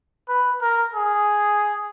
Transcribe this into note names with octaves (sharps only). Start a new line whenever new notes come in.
B4
A#4
G#4